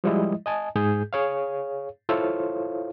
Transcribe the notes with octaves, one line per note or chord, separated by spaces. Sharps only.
F3 G3 G#3 E4 D#5
D#5 G#5 A5
G#2 G#4 G6
G#4 C#5 F5
E4 F4 A4 C5 C#5 F5